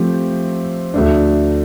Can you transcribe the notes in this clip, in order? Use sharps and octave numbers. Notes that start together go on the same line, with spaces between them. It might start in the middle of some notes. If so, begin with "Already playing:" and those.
Already playing: F3 A3 C4 G4
D2 D3 A3 D4